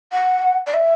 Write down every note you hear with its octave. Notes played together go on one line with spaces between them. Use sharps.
F#5
D5
E5